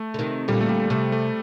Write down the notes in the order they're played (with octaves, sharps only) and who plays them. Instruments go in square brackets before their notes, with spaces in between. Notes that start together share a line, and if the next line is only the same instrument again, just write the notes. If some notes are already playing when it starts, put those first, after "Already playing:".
Already playing: [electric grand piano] A3
[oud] D3
C3 D#3
[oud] A#2 D3 [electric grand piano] G3
[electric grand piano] A3
G3
[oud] C3 [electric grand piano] A3
[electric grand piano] A3